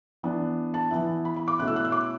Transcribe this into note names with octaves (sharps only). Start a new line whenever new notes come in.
E3 B3 D4
A5
E3 B3 E4
B5
B5
D6
B2 A3 C#4 E4 F#6
E6
F#6
E6
D6